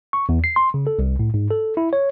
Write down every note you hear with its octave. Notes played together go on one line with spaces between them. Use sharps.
C#6
E2
C7
C6
C#3
A4
C2
A2
G#2
A4
E4
C#5